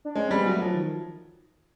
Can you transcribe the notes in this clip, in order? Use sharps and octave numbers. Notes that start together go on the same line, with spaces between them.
D4
G#3 C#4
G3 C4
B3
F#3 A3
F3 F#3
D#3